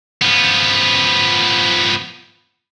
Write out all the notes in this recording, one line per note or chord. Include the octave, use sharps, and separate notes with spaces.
F3 B3